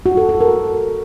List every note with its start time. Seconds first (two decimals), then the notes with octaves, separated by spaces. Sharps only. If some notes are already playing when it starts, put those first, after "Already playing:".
0.06 F#4
0.17 A4
0.29 A4
0.41 A#4